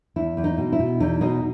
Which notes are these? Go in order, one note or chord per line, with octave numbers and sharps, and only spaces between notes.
E2 E4
E2
D#4
B2
E4
B2
E2 D#4
B2 D#4